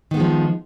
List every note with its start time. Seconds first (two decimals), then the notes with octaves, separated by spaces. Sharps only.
0.11 D#3
0.14 B3
0.17 G#3
0.20 F3